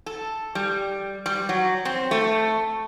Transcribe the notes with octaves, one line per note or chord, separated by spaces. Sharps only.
A4
G3
G3
F#3
C4
A3